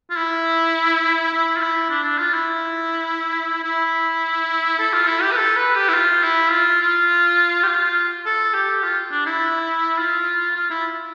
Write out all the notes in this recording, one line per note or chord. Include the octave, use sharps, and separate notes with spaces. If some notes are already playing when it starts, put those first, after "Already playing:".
F4
E4
E4
F4
E4
D4
D4
F4
E4
E4
A4
F4
E4
G4
B4
A4
B4
G4
E4
F4
E4
F4
F4
G4
F4
A4
G4
F4
D4
E4
F4
F4
E4